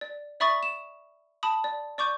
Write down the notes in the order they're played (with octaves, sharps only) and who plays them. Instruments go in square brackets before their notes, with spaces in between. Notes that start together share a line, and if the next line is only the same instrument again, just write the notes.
[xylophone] D5
D5 E5 B5 C#6 D#6 A6
E7
A5 B5 D#6
D5
D5 C#6 D6 G6